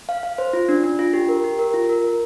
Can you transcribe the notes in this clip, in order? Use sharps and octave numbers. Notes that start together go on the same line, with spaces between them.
F5
F5
C5
F4
D4
D4
F4
G4
A#4
G4
A#4
F4
A#4
A#4